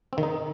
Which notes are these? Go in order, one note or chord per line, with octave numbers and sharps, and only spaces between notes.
C4
D#3
D#4